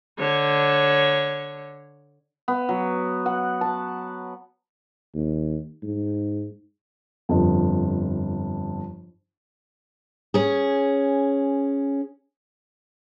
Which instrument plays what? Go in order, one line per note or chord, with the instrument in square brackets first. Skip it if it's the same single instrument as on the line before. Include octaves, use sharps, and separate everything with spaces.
[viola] D3 C#5
[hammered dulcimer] B3
F#3
F#5
A5
[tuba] D#2
G#2
[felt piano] G1 F2
[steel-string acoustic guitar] C#4 G#4